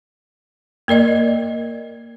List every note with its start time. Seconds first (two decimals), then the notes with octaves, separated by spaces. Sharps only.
0.88 A#3 A#4 D5 D#5